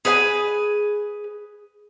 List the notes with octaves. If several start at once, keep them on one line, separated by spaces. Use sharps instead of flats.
G#4 B4 F#5 G#5